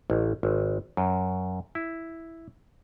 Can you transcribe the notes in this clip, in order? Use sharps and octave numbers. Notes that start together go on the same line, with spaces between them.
A1
G#1
F#2
E4